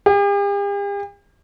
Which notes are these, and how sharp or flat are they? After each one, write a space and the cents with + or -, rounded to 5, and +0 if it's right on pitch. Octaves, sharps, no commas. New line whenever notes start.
G4 +45